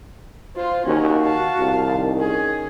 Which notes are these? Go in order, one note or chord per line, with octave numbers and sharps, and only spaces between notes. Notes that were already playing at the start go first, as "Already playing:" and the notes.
F4 C5
D#2 C#4 F#4 A#4
F5 A5
C2
D#3
C#4 G#4